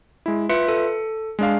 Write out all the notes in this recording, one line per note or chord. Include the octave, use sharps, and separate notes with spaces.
G#3 E4
F4 B4 E5 C#7
A4
G#3 D4 F5